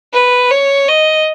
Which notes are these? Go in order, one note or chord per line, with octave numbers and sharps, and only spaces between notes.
B4
C#5
D#5